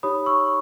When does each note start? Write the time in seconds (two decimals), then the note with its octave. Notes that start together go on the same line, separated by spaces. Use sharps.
0.03 D#4 G4 C#5 B5 D#6
0.26 C#6 E6